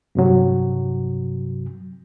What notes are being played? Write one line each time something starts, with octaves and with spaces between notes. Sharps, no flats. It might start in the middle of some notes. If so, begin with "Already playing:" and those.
G2 C3 F#3